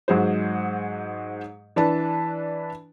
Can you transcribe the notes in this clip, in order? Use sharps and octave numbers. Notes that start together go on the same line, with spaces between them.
G#2 F#3 G#4 C5
E3 D4 B4 A5